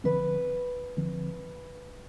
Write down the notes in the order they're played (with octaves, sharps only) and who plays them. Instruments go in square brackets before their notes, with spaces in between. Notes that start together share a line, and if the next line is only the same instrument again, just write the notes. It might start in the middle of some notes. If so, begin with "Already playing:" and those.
[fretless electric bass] D3 F3 C4 [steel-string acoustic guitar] B4
[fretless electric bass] D3 F3 C4